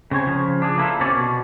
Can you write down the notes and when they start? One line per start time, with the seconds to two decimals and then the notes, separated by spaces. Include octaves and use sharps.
0.11 C#3 C4 C#5 G#5
0.27 C#3 F3
0.62 D4 G#4
0.78 A#3 E4 F4 A4
1.00 C3 C4 C#4 C#5 D5
1.14 B2